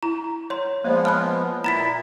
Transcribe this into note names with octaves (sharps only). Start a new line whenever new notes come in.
E4 A#5
C#5 C6
F3 G#3 A#3 B3 C5 D5
C#5 A5 B5 F6 F#6
A#2 E4 A#5 A6 B6